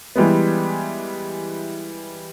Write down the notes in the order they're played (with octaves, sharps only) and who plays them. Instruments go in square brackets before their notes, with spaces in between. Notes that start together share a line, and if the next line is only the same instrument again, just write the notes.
[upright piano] E3 G3 G#3 B3